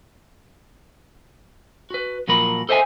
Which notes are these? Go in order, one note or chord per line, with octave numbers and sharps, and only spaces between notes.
F#4 B4
A#2 F3 F#3 A#4 B5
A4 C5 D#5 E5 G#5